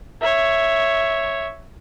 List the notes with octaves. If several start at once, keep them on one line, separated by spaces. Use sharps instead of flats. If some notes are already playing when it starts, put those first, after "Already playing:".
C#5 E5